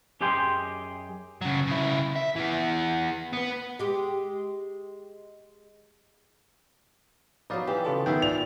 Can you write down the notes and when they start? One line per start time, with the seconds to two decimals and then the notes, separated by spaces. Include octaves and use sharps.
0.21 F#2 G4 G#4 D#5 G5 C6
1.41 C#3 F#3
1.68 C#3 E4
2.16 E5
2.36 E3 B3
3.33 B3 B4
3.79 G#3 G4
7.50 F#3 B3 D#4 B4 D5 F5
7.67 E3 G4
7.84 C#3 F4 G4 A4
8.06 D#3 B3 E5 G5
8.22 A#2 D5 F7